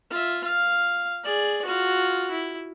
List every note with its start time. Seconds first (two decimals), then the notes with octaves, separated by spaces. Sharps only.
0.10 F4 E5
0.44 F5
1.24 G#4 D5
1.65 F4 F#4
2.31 E4